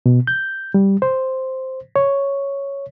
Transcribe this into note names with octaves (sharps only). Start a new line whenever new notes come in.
B2
G6
G3
C5
C#5